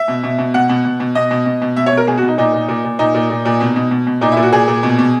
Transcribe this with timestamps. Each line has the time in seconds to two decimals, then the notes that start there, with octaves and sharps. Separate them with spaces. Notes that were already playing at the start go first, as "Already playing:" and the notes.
Already playing: E5
0.08 B2
0.24 B2
0.39 B2
0.54 B2 F#5
0.69 B2
0.85 B2
1.00 B2
1.15 B2 D#5
1.31 B2
1.46 B2
1.62 B2
1.76 B2 E5
1.86 C#5
1.92 B2
1.97 A#4
2.07 B2 G#4
2.17 F#4
2.22 B2
2.28 D#4
2.38 A#2 D#4
2.54 A#2
2.68 A#2
2.84 A#2
2.99 A#2 D#4
3.14 A#2
3.30 A#2
3.45 A#2
3.60 B2
3.76 B2
3.91 B2
4.07 B2
4.21 A#2 D#4
4.32 E4
4.37 A#2
4.42 F#4
4.52 A#2 G#4
4.68 A#2
4.83 B2
4.99 B2